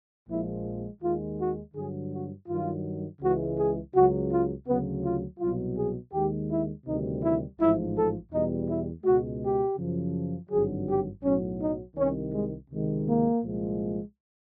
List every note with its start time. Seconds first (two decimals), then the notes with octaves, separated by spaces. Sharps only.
0.28 A#1 A#2 F3 G#3 E4
1.01 D#2 D#3 G#3 F4
1.38 F#4
1.74 G2 D3 F#3 G#4
2.11 F#4
2.47 G2 D#3 F#3 F4
3.20 C#2 C#3 E3 G#3 F#4
3.57 G#4
3.93 C#2 C#3 F#3 F#4
4.30 F4
4.66 D2 C#3 F#3 B3
5.03 F4
5.39 C2 B2 F#3 F4
5.75 G#4
6.12 D#2 D#3 G#3 G4
6.49 E4
6.85 D2 C3 D#3 G3 D#4
7.22 E4
7.58 A1 G#2 F3 E4
7.95 A4
8.31 E2 B2 G3 D#4
8.67 E4
9.03 C#2 B2 G#3 F#4
9.41 G4
9.77 F#2 C#3 F3
10.49 G#1 G2 D3 F#3 G#4
10.87 G4
11.23 B1 A2 F#3 C#4
11.60 D#4
11.95 C2 C3 D#3 C#4
12.32 G#3
12.69 C#2 C3 D#3 G#3
13.05 A#3
13.42 C2 A#2 F3 G#3